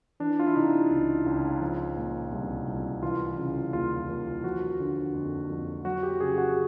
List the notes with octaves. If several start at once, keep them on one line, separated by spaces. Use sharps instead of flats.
E3 D4
F4
E4
C3 D#4
C#2
C#2
F3
A#2
C2
C2
E3 F4
C#3
D#2 F4
D#2
F3 F#4
D3
F2
F2
F#3 F#4
G4
C#3 G#4
F#4